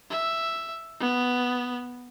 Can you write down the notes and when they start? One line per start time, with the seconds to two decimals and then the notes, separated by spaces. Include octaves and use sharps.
0.11 E5
1.00 B3